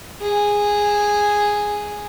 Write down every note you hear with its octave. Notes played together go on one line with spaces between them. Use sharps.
G#4